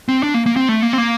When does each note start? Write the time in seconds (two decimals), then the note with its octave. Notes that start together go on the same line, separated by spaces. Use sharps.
0.08 C4
0.23 D4
0.34 A#3
0.46 A#3
0.56 C4
0.69 A3
0.82 A#3
0.93 C4
0.98 A#3